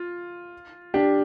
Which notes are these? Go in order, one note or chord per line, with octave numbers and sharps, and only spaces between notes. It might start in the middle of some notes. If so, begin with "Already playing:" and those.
Already playing: F4
D4 G4